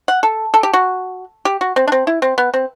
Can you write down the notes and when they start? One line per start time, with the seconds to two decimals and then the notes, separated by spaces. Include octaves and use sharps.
0.08 F#5
0.23 A4
0.54 A4
0.63 G4
0.73 F#4
1.45 G4
1.61 F#4
1.76 C4
1.88 D4
1.92 C4
2.07 E4
2.22 C4
2.38 B3
2.54 C4